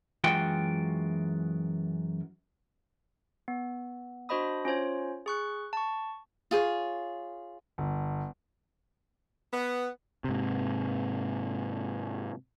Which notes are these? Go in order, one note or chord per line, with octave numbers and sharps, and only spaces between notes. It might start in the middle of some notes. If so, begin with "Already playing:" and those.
F#2 E3 G#3 F4 F#4 G5
B3
D4 F#4 C5 D#5 B5 D#6
C#4 F4 C5 C#5
G#4 C#6 F#6
A5 C#6
F4 G#4 C5 C#5
G1
B3
G#2 C3